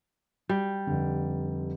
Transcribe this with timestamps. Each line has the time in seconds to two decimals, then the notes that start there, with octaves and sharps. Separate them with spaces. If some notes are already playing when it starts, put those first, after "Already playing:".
0.49 G3
0.87 F1 D3